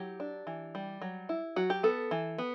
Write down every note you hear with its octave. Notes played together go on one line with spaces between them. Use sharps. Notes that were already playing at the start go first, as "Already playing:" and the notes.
Already playing: F#3 E4 G4
D4
E3
G3
F#3
E4
F#3 F#4
G4
B3 A4
E3
B3